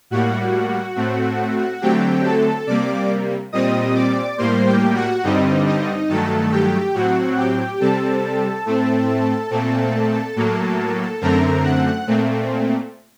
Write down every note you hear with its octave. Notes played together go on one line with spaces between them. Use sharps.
A2 G3 A#3 F#4 F#5
A2 A3 C4
D3 F#3 A3 C4 G4 G5
A4 A5
C3 G3 A#3 D5 D6
A#2 G3 C4 D#5 D#6
D5 D6
A2 G3 A#3 C5 C6
G4 G5
F#4 F#5
G2 D3 G3 C4 D#4 D#5
D#4 D#5
G2 D#3 F#3 A3 A4 A5
G4 G5
A2 F#3 C4 F#4 F#5
G4 G5
C3 G3 C4 A4 A5
A2 A3 C4
A#2 A3 C4
A2 F#3 A#3
F#2 D3 A3 C4 A#4 A#5
F#5 F#6
A#2 A3 C4